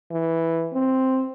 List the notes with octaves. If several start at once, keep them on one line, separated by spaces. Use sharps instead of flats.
E3
C4